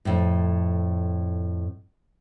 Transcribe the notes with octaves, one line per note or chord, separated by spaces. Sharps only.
F2 A2